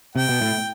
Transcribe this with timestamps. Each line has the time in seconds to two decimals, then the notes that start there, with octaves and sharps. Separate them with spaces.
0.16 C3 G5
0.29 B2
0.41 A2